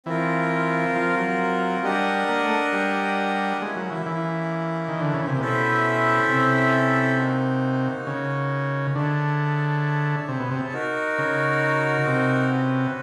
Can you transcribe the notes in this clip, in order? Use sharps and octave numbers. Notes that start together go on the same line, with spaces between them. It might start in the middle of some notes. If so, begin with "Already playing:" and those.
E3 C4 F4 A#4
F3
F#3
G3 D4 G4 A#4 D#5 F#5
A#3
A3
G3
G#3 A#3 C#4 E4 G4
F#3
E3
E3
D#3
D3
C#3
C3
B2 C#4 E4 A4 C5 E5
C3
A#3 D#4 F#4
C#3
D3 G#4 C#5 E5 A5
C3
B2
C3
D#4 F#4 A#4
C#3
C3
C#4 F#4 B4